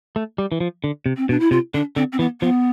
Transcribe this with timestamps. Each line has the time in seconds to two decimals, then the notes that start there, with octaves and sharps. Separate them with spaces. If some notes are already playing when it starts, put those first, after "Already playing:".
0.16 A3
0.38 G3
0.52 E3
0.60 F3
0.84 D3
1.06 C3
1.17 C4
1.29 B2 D4
1.40 E4
1.51 C3 F4
1.74 D3 D4
1.96 D3 C4
2.12 C4
2.19 E3 B3
2.41 F3 B3